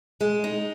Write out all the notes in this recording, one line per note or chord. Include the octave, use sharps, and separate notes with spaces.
G#3
D#4